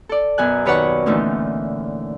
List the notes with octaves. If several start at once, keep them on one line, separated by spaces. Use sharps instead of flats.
A4 D5
F#2 B2 F#3 G#5 F#6
D#2 B4 C#5 D5 F#5 C#6
A#2 D3 E3 A3 C#4 D#4